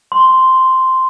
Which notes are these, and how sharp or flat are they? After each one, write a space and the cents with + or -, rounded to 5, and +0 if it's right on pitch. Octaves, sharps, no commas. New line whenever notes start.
C6 -5